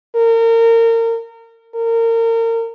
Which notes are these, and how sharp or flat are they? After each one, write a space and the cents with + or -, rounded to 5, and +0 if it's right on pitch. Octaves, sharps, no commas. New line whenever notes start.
A#4 -30
A#4 -30